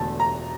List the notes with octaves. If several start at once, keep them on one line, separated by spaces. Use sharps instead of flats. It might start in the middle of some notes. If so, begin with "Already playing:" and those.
Already playing: E1 E2 D3 A3 A5
A#5